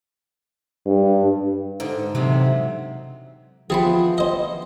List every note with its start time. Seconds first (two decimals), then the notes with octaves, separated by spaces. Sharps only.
0.86 G2
1.80 G#2 D3
2.15 E2 C3 F#3
3.70 E3 F3 B3 C4 G#4 A5 B5
4.18 C5 D#5